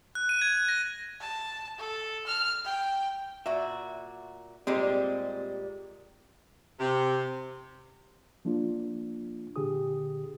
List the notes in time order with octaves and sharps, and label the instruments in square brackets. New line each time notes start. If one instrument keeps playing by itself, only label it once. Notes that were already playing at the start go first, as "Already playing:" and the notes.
[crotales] F#6
D#7
G#6
A#6
[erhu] A5
A4
F6
G5
[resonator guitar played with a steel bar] A#2 F#4 [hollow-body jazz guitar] E5
[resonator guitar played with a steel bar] A#2 G3 G#3 [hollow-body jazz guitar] C4 G4
[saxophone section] C3
[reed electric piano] F3 A#3 D4 F4
A#2 D3 G4 G#4 D#6